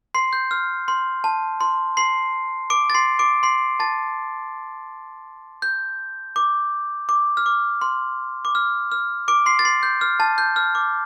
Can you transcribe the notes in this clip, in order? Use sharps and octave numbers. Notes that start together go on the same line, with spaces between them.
C6 C7
G6
F6
C6
A5
C6
C6 C7
D6 D7
A6
C6 C7
D6 D7
C6 C7
A5 A6
G6
D6
D6
F6
D6
C6
D6
F6
F6
D6 D7
C6 C7
A6
C6 C7
G6
F6
A5 A6
G6
F6
D6